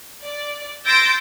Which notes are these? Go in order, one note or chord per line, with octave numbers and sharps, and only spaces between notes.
D5
C6 E6 G6 A6 A#6 D7